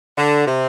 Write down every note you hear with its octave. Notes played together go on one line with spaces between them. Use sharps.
D3
C3